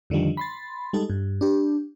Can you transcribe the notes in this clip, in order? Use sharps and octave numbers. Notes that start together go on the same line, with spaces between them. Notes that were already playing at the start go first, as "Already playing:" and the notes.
F2 D3 D#3 F3 G3
B5 C6 A6
G3 G#3 D#4 A4
G2
D4 G4